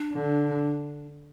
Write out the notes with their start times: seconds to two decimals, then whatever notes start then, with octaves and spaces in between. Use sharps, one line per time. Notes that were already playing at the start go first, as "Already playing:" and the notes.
Already playing: D4
0.13 D3